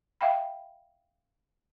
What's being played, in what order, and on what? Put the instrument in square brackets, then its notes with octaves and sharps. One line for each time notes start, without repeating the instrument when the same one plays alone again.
[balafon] E5 F5 G5 B5